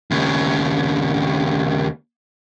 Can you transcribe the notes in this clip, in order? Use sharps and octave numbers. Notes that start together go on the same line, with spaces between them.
D#2 C#3